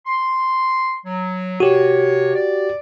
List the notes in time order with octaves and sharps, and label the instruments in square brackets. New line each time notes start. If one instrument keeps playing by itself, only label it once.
[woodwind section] C6
F#3
[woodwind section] C3 C#5 [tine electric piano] F#4 G4
[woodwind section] D5